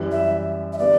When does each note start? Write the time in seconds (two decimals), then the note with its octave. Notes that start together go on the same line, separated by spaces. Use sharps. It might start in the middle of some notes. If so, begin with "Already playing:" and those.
Already playing: F#2 E3 G3
0.11 E5
0.73 E5
0.79 D3 G3 B3 D4 D5